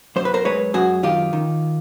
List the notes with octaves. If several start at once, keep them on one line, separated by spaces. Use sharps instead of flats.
F#2 C5
B4
A#4 C5
G#3 B4 C#5
F#2 F#4 G#4
D#3 F4 G4
D#3